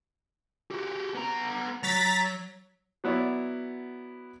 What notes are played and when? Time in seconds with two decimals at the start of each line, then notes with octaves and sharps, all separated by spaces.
0.71 F#4 G4
1.15 B3 A#5
1.83 F#3 A#5 A6 B6
3.04 F#3 B3 E4 C#5 D5